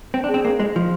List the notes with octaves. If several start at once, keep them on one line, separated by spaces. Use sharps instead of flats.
C4
D4
G#4
C4
A#3
G#3
F3